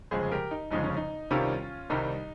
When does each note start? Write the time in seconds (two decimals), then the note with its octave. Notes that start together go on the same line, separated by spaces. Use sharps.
0.11 G1 F2 C#3 G#3 G#4 C5
0.31 G4 A#4
0.51 D#4
0.71 G1 F2 C#3 G#3 D#4
0.83 C#4
0.97 D#4
1.31 C2 C3 D#3 G3 C#4 F4
1.90 C2 C3 D#3 G3 D#4